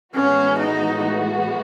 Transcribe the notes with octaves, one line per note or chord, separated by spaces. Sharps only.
A2 E3 G#3 B3 C#4 F#4
D#4